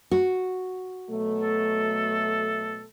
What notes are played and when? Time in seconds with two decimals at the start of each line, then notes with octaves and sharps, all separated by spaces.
0.11 F#4
1.10 B2 F#3 A3
1.42 A4